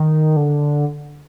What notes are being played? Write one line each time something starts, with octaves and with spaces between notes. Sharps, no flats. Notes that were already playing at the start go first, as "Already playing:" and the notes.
Already playing: D#3
D3